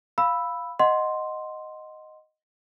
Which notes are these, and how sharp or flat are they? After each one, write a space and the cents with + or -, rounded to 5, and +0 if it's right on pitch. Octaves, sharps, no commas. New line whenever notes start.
F5 +0 B5 +0 E6 +0
D#5 +0 F#5 +0 C6 +0